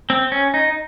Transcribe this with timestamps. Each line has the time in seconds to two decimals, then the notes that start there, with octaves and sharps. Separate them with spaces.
0.10 C4
0.32 C#4
0.54 D#4